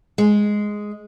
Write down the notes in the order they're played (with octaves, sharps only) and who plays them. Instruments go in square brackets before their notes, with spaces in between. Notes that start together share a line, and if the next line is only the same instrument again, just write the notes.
[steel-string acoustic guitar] G#3